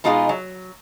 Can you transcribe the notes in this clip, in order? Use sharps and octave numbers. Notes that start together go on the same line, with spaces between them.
B2 G#3 D#4 F4 G4 G#4
F#3